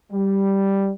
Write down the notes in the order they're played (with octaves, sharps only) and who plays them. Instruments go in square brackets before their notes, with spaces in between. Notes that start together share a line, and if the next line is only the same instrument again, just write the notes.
[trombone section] G3